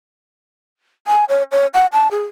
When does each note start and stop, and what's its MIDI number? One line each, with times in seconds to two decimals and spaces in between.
1.07 1.25 80
1.29 1.43 73
1.52 1.67 73
1.74 1.86 78
1.93 2.08 81
2.11 2.23 68